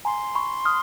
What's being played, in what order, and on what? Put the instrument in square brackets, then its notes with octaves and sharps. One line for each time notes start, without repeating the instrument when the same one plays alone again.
[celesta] G#5 A#5 [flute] C6
[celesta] B5 C#6
D#6 F6